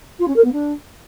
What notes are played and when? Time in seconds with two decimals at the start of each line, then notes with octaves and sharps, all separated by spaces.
0.19 F4
0.27 C#4
0.36 A#4
0.44 B3
0.52 D4